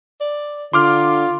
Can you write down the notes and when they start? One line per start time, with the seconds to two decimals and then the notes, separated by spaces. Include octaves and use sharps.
0.20 D5
0.73 D3 F4 C6 D6 F6